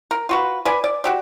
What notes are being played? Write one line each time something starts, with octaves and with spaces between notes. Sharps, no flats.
A#4
F4 F#4 B4
B4 D5 G#5
D5
F#4 G4 D5